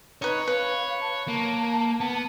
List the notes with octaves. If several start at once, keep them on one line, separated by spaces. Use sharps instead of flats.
D#4 B4 C#5
B4 F5
A5
A#3
B3